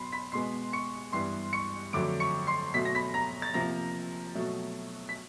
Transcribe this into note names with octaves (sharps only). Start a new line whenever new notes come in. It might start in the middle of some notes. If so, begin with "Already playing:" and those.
Already playing: B2 F#3 B3 B5 C6 C7
B5 B6
B2 G#3 B3 C6 C7
C#6 C#7
G2 E3 G3 B3 C6 C7
C#6 C#7
F2 D3 F#3 A3 D6 D7
C#6 C#7
C6 C7
B2 F#3 A3 B6
A#6
B5 B6
A#5 A#6
A6
C3 F3 A#3 A#5 A#6
B2 F#3 A3
B6